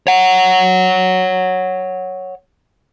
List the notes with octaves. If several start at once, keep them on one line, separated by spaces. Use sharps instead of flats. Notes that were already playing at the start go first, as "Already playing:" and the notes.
C#5 F#5